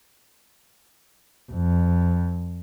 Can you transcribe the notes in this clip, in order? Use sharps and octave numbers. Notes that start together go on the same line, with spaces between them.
F2